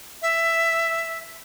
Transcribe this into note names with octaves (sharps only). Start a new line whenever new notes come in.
E5